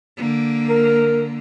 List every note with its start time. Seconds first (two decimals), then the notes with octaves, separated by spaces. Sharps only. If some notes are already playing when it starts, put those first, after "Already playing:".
0.17 D3 A#3
0.70 A#4